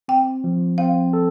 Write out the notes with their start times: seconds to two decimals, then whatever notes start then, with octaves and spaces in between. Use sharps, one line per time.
0.08 C4 G5
0.44 F3
0.78 C4 F5
1.13 A4